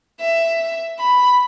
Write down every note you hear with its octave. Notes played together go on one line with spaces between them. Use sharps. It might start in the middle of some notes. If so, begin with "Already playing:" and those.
E5
B5